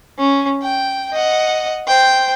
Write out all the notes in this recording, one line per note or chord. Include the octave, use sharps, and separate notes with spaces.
C#4
G5
D#5 F#5
C5 G5